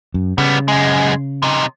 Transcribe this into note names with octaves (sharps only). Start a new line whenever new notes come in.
F#2
C#3 G3 B3
F#2 G#3
C3 D#4